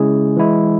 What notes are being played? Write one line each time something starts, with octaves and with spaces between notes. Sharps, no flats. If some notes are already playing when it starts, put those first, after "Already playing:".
Already playing: C#3 G#3 C#4 E4 G#4
E3 G#3 E4